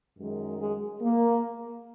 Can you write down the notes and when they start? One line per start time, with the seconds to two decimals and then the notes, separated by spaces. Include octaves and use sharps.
0.18 F#2 D#3 G#3
0.60 G#3
1.02 A#3